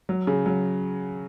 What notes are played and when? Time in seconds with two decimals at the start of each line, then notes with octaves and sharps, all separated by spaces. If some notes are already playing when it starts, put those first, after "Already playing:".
0.09 F#3
0.27 C#3
0.46 F#3